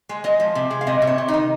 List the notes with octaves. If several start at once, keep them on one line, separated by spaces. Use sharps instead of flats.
G#3
G#3 D#5
F3
C3
G#3
F5
C3 D#5
C3
C#5
C3
D#4
D#3